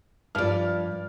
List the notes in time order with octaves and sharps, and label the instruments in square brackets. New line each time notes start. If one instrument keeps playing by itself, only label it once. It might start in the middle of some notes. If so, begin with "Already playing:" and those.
[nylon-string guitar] G2 D5 [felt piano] F3 F6